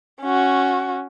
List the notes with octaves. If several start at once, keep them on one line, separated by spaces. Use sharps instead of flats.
C#4 F#4